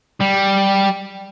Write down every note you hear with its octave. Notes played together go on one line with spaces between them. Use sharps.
G3